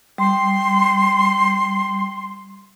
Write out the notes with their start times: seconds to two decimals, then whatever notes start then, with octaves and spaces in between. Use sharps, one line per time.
0.18 G3 C6